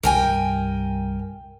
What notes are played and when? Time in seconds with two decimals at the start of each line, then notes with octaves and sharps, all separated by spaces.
0.03 C2 G2 A#4 G5 G#5